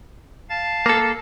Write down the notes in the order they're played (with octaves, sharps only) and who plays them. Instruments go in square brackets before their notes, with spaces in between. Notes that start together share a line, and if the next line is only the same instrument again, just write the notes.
[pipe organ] F5 A5 A6
[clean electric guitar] A#3 A4